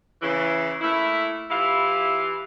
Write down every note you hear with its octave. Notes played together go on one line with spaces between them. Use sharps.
C#3 E3
A3 A#3 E4
E3 E4 F4 G4 F5